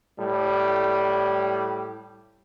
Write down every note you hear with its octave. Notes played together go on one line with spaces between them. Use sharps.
A2 G3